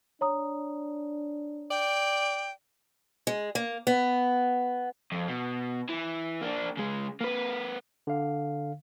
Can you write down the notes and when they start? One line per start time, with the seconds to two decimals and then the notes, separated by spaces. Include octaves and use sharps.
0.21 D4 C#5 A#5 D#6
1.70 D5 G5
3.27 G#3
3.55 A#3
3.87 B3
5.12 F2
5.28 B2
5.89 E3
6.41 A#3 D4
6.77 C#3 G#3
7.21 A#3 B4
8.07 D3 F5